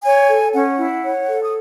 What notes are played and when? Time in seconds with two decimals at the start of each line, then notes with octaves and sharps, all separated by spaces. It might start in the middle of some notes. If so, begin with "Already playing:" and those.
0.03 C#5 G#5
0.28 A4
0.53 C#4 F#5
0.78 E4
1.03 C#5
1.27 A4
1.44 D#6